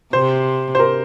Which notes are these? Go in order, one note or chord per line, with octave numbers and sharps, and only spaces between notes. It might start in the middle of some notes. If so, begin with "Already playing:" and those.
C3 C5
C5
A#4